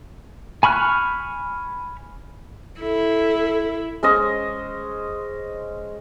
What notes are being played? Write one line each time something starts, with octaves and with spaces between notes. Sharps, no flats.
G#5 B5 C#6 F6 F#6
E4 A4
G#3 C#4 C5 D#5